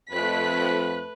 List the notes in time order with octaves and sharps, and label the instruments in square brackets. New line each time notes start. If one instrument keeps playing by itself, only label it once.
[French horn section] F2 [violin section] A3 F#6 B6 [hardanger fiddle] B4